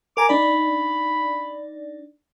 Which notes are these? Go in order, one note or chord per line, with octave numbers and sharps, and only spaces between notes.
A#4 G#5 A#5 D6
D4 D#4 D5 B5